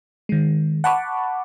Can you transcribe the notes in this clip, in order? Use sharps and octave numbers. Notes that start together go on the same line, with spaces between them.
D#3 G#3
F#5 A5 B5 C#6 D6